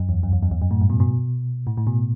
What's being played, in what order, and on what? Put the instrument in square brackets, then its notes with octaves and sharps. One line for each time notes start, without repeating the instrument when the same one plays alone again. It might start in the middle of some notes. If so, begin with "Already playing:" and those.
Already playing: [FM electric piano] F#2
E2
F#2
E2
F#2
E2
F#2
A2
G2
B2
B2
A2
A2
B2